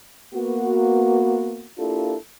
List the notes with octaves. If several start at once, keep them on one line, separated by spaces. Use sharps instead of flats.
A#3 B3 F#4
A#3 D4 E4 F4 G4 A4